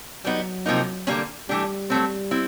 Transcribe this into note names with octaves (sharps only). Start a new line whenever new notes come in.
F#3 G3 B3 D#4
C3 F3 A#3 D#4
D3 G3 A#3 C#4
E3 G3 A3 D4 G4
F#3 A3 C4
C4 E4